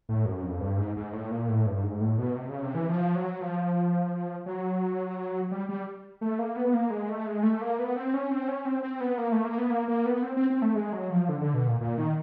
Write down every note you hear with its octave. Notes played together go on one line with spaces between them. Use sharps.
A2
F#2
F2
G2
G#2
G#2
A2
A#2
A2
G2
G#2
A2
B2
C3
C#3
C3
E3
F3
F#3
F3
F#3
G3
G3
A3
A#3
B3
A#3
G#3
A3
G#3
A3
A#3
B3
C4
C#4
C4
C#4
C4
C4
B3
A#3
A3
A#3
B3
A#3
A#3
B3
C4
C4
C4
A3
G#3
F#3
F3
D3
D3
B2
A#2
A#2
D#3